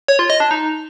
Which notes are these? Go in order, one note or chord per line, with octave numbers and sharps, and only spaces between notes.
C#5
F4
D#5
D4
D#4